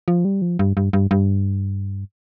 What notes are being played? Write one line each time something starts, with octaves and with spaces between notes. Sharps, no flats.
F3
G3
F3
G2
G2
G2
G2